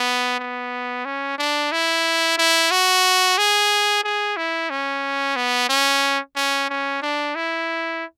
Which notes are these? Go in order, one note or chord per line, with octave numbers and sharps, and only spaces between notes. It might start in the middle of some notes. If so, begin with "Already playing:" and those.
Already playing: B3
B3
C#4
D4
E4
E4
F#4
G#4
G#4
E4
C#4
B3
C#4
C#4
C#4
D4
E4